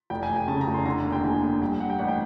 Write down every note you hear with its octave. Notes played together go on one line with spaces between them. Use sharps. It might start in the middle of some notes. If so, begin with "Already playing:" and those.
F1 G5
G#5
F1
G5
C#3 A5
A#5
F1
C6
D3 A#5
D#2
G5
D3 G#5
D#2
G2 G5
G2 F#5
G5
A1 F#5
G5